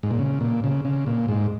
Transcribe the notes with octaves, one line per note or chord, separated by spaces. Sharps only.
G#2
A#2
C#3
A#2
C#3
C#3
A#2
G#2